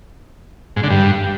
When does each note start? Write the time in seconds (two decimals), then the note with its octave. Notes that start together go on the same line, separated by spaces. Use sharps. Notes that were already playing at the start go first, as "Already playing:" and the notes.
0.76 G#2
0.83 D3
0.90 G2